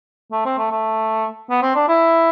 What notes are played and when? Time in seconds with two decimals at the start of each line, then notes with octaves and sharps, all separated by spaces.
0.32 A3
0.45 C4
0.58 A3
0.71 A3
1.50 B3
1.62 C4
1.75 D4
1.88 E4